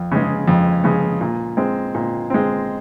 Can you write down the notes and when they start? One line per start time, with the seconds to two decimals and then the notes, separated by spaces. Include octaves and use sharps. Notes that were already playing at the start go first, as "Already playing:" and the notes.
Already playing: F2
0.11 C#3 G#3
0.48 F2
0.84 C#3 G#3
1.21 A#2
1.57 G#3 C4
1.95 A#2
2.30 G#3 C4